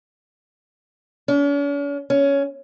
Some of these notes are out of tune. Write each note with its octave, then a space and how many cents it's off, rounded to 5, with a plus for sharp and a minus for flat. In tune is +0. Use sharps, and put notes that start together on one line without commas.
C#4 +45
C#4 +10